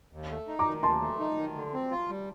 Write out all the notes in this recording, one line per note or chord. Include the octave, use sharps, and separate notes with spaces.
D#2
A3
D#4
A#5 D6
D#3
D#2 A5 C6
A3
D#4
D#3
D3
C4
F4
G3